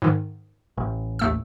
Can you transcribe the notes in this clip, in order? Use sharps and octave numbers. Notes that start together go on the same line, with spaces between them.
G#2 D#3
A1
D#2 A3 E6